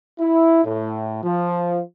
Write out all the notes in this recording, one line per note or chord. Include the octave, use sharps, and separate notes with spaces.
E4
A2
F3